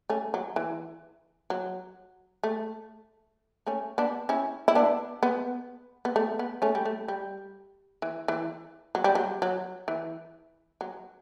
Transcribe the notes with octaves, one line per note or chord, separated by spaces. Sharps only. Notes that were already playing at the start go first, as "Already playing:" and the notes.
A3 C#4
F#3
E3
F#3
A3
A3 C#4
B3 D4
C#4 E4
E4
B3 D4
B3
B3
A3
B3
A3 C#4
G3
A3
G3
E3
E3
F#3
G3
F#3
F#3
E3
F#3